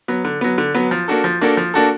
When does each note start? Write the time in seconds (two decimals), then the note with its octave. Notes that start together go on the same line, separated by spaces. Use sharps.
0.08 F#3 B3
0.25 D3
0.41 F#3 B3
0.58 D3
0.75 F#3 B3
0.91 F3
1.08 A#3 D4 F#4 A4
1.24 F3
1.41 A#3 D4 F#4 A4
1.57 F3
1.74 A#3 D4 F#4 A4